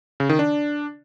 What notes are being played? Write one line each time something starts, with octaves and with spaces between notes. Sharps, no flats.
C#3
D#3
D4